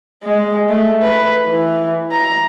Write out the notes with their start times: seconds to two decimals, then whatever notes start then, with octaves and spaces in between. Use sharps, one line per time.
0.23 G#3
0.69 A3
1.03 B4
1.46 E3
2.11 A#5